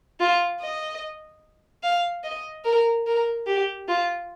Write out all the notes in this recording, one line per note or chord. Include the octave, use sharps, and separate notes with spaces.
F4
D#5
F5
D#5
A#4
A#4
G4
F4